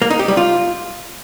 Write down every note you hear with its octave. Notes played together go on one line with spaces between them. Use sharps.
A#3
D#4
G4
G3
F4